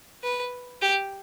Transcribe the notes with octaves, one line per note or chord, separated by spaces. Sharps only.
B4
G4